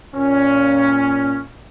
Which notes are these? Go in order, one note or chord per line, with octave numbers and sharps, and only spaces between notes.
A#2 C#4